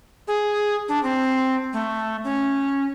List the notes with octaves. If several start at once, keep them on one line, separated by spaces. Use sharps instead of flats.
G#4
D4
C4
A3
C#4